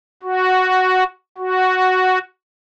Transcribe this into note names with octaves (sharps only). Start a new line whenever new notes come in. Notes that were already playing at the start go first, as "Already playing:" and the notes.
F#4
F#4